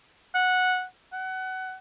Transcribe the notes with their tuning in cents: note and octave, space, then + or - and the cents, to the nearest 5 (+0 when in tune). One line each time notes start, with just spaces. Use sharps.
F#5 -10
F#5 +25